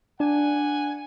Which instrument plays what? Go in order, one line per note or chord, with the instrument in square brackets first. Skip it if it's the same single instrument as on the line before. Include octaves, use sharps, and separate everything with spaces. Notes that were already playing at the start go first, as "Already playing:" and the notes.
[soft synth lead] D4 [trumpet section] F#5 G#5